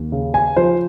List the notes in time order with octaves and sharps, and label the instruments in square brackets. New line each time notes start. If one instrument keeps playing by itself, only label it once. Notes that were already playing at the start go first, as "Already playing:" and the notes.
Already playing: [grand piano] D#2
C#3
G#5
F3 C5